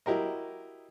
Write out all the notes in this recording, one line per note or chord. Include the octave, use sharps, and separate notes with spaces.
F#3 E4 G4 A#4 D#5